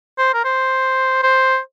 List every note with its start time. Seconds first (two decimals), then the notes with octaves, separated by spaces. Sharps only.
0.18 C5
0.34 A#4
0.44 C5
1.23 C5